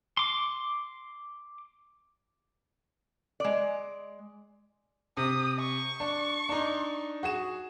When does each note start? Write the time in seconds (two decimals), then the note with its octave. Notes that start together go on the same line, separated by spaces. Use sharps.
0.17 C6 D6
3.40 G#3 D5
5.17 C3 D#6
5.59 C#6
6.00 D4
6.49 D4 D#4
7.23 F#4 G#4 E7